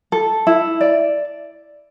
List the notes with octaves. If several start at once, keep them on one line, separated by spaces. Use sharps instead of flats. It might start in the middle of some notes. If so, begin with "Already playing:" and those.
A4
E4
D5